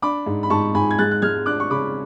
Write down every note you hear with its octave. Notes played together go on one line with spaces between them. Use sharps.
D4 B5 D6
G#2
B5
G#2 A5 C#6
G#2 G#5 B5
G#6
G#3 F#6 A6
F#6
G#3 F6 G#6
D4 D6 F#6
C#6
C#3 B5 D6